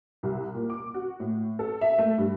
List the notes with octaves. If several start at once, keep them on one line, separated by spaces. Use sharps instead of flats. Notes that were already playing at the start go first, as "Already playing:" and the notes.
C2
A#2
D6
F#4
A2
A4
E5
A3
G2